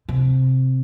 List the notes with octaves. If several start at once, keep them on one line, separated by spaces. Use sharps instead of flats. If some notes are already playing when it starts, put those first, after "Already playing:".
C3